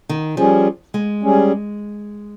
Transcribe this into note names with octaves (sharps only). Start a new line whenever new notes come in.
D#3
F3 G3 C#4 G#4
G#3
G3 C#4 G#4